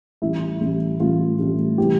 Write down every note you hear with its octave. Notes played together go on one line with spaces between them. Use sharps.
A1 A2 G3 E4
A1 A2 G3
A1 A2 G3 F4
A1 A2 G3
C3 E3 G3 G4